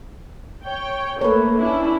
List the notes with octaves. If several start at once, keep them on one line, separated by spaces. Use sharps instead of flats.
C#5 G5
A3 A#3 B4 C#5
C#4 D4 E4